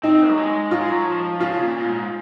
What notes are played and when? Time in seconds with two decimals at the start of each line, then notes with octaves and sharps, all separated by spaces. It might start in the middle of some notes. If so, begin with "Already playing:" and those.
0.03 C4 D#4
0.29 F#3
0.37 G#3
0.71 F#3 F4
0.81 G#3
0.90 F#3
1.06 F3
1.40 C#3 F4
1.63 A#2
1.79 A#2
1.85 G#2